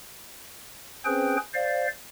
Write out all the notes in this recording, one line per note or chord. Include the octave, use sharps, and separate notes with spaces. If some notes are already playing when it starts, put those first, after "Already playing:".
C4 C#4 G#4 B4 C5 G5
C5 D5 F5